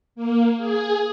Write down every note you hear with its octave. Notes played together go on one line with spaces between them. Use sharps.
A#3
G#4